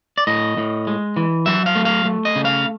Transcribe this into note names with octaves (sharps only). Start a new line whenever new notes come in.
D5
A2 D#5
A2
G#3
E3
F#3 E5
F5
A3
F5
A3
D#5
C#3
F5